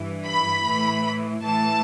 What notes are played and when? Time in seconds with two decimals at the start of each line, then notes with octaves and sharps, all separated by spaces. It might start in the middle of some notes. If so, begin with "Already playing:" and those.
Already playing: G2 E3
0.26 B5
0.65 A2 E3
1.43 A2 E3 A5